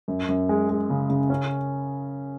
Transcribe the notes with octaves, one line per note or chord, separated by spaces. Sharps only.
F#2
F#2
G#3
G#3
C#3
C#3
C#4